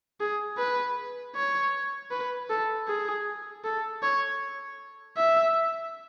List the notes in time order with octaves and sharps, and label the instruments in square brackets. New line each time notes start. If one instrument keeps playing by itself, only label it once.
[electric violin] G#4
B4
C#5
B4
A4
G#4
A4
C#5
E5